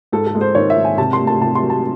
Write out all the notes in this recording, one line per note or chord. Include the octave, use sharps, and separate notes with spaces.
G#2 A4
A4
G#3
C5
D#3 C#5
E5
G#2
G#5
C3 A5
C6
A3
A5
C3 A5
C6
F#3
A5